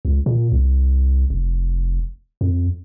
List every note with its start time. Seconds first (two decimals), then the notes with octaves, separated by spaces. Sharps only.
0.05 C#2
0.26 A#2
0.52 C2
1.30 F1
2.41 F2